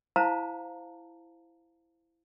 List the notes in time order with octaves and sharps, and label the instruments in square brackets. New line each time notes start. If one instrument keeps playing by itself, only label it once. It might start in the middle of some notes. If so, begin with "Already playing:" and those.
[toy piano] E4 C5 F5 A5 A#5